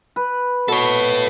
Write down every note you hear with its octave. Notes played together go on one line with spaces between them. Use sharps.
B4
B2 A4 C#5